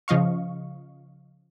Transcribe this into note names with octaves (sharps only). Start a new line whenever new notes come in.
C#3 F3 D#5 F5 C#6